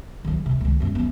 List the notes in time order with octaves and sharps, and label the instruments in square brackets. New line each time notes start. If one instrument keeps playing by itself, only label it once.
[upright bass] D#3 F#3
C3
C#2 D#3
F#2 G#3
F#3 B3